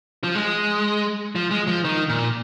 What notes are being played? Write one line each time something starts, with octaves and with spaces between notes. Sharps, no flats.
F3
G#3
F3
G#3
F3
D#3
A#2